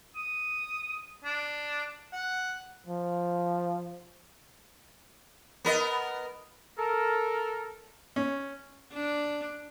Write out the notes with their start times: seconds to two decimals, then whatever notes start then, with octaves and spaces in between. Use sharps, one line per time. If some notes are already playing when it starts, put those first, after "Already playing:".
0.16 D#6
1.24 D4
2.13 F#5
2.87 F3
5.65 B3 A#4 D#5
6.78 A4 A#4
8.16 C#4
8.92 D4